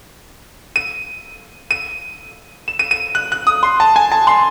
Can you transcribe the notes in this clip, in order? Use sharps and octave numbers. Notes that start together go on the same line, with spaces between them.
D#7
D#7
E7
D#7
D#7
F#6
F#6
D#6
C6
A5
G#5
A5
C6